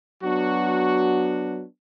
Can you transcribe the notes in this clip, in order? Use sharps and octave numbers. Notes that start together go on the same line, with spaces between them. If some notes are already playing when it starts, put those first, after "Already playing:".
F#3 B3 D4 F#4